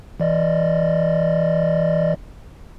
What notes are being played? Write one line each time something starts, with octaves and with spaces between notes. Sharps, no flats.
E3 D5 D#5